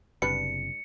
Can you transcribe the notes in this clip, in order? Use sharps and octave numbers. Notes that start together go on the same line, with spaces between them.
F#1 C3 G3 D4 B4 C#7